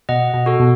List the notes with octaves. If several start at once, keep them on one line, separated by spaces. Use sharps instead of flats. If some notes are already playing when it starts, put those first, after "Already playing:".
B2 D#5 F#5
B2
F#4 A4
B2